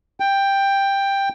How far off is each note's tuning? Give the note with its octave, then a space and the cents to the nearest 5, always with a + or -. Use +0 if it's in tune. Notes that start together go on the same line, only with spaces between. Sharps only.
G5 +10